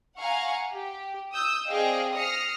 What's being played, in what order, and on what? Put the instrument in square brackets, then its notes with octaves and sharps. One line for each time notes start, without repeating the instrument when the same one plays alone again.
[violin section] F5 F#5 G#5 A#5 C#6
G4
D#6 E6 G6
C4 G#4 D5 D#5 F5 G5
D#6 F6 A#6 C7 C#7